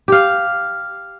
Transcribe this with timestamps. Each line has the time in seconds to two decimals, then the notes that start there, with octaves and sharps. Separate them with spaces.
0.08 G4 F5